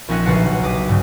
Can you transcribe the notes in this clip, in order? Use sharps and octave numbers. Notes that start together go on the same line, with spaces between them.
A#1 C4 C#4 D#4 E5 F#5
D#1 B1 C#3 D4 F#5 C7
D6 D#6 B6
G2 C#3